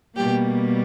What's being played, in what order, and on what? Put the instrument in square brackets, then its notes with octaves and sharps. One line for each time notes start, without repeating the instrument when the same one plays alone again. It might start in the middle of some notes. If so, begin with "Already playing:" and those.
[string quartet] B2 G3 A#3 G4